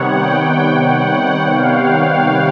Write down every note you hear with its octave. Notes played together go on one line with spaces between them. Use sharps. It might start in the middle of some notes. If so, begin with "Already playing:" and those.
Already playing: C3 D#3 G3 B3 C#5 F#5
G5
F#5
F5
F5